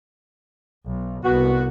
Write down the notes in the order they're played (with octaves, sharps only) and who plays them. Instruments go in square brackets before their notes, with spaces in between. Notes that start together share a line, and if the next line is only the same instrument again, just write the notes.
[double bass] B1
[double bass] C2 [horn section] B3 F#4